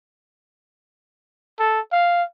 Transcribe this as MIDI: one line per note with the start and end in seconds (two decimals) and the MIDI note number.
1.59 1.80 69
1.92 2.23 77